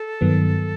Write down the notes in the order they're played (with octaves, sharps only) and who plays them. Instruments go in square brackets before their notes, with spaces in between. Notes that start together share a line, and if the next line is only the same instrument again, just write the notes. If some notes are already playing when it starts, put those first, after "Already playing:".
Already playing: [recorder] A4
[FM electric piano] G2 D#3 F#3 B3